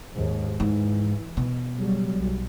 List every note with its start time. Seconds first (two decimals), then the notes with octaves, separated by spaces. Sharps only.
0.13 D#2 G#2
0.60 G#2 E3
1.37 B2
1.76 C#3 F#3 G3
2.14 B1